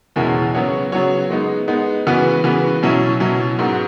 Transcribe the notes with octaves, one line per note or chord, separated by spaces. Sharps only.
E2 B2 G#3 C#4 E4
C#3 F#3 B3 F#4 C#5
C#3 F#3 B3 F#4 C#5
G#3 B3 D#4
G#3 B3 D#4
C#3 E3 B3 F#4 B4
C#3 E3 B3 F#4 B4
B2 F#3 C#4 E4
B2 F#3 C#4 E4
G#2 F#3 B3 F#4